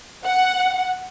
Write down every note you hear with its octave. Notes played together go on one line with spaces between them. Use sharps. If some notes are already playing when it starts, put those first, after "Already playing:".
F#5